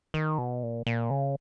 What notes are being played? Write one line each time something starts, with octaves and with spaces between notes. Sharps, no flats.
D#3
B2
A#2
A#2
C#3